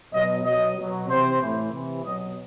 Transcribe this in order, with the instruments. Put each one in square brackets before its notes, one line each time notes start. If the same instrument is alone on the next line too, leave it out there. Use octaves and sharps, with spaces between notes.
[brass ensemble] B2 F#3 D#5
B2 F#3 D#5
B2 F#3
C3 E3 C5
A2 E3
C3 E3
B2 F#3 D#5